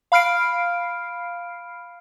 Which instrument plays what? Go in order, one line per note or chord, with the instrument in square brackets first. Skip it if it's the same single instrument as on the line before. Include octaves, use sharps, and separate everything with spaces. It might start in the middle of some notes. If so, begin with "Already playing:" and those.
[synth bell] F5 B5 F6 C7 D7